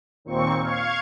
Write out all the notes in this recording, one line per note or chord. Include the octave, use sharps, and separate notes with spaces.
D#2 A#2 C4 C#6
F5 C#6 G#6